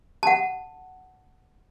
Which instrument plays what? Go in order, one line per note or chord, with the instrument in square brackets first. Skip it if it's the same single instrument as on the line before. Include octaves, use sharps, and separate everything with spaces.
[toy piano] F#5 A5